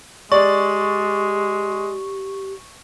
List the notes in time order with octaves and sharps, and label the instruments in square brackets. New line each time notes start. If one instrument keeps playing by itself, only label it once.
[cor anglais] G#3 [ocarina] G4 [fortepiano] D5 [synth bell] C#6